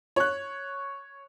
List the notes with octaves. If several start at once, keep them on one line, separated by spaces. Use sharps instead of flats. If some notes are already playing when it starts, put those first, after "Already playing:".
C#5 F#6